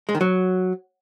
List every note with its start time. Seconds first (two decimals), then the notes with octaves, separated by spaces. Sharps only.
0.09 G#3
0.15 D#3
0.21 F#3